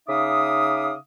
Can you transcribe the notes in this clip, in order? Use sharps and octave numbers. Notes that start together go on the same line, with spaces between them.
C#3 D#4 E5 F5 D6 D#6